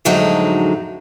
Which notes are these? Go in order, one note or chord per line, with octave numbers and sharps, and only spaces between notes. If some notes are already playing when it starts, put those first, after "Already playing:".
F2 A2 D3 F#3 G#3 D#4